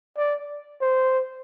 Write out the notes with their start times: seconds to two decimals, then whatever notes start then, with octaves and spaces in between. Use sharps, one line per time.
0.17 D5
0.81 C5